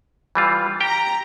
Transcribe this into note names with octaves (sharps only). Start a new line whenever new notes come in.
E3 G3 F4
G4 G5 A#5